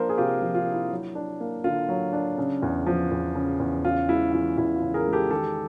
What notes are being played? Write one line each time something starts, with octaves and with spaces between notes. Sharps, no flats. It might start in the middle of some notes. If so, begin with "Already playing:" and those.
Already playing: F3 A#3 D4 A#4 C5
G#4
C3 F4 G4
F3
F4
D4
E4
F#3
D4
A#3
D3 F4
F#3
D4
C#3
E2
F3
E2
C#3
E2
C#3 F4
G#3 E4
E3 F4
E2 E4
F4
C#3
G#4 A#4
G#3
G4 A4
D#3 G4 A4